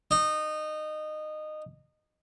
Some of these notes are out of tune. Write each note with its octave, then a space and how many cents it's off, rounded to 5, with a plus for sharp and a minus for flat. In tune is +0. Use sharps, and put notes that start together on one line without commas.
D#4 -20